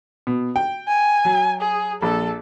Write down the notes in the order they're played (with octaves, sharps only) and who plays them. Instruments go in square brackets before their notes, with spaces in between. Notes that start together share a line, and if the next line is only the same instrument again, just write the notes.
[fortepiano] B2
G5
[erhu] G#5
[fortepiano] F#3
[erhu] G#4
[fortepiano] A#1 [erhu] A4